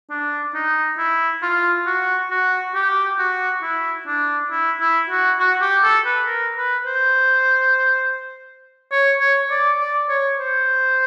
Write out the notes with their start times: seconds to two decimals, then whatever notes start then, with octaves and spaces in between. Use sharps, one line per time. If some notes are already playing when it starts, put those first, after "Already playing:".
0.10 D4
0.54 D#4
0.98 E4
1.43 F4
1.87 F#4
2.31 F#4
2.75 G4
3.19 F#4
3.63 E4
4.07 D4
4.51 E4
4.80 E4
5.10 F#4
5.39 F#4
5.61 G4
5.83 A4
6.05 B4
6.27 A#4
6.57 B4
6.86 C5
8.92 C#5
9.21 C#5
9.50 D5
9.80 D5
10.09 C#5
10.39 C5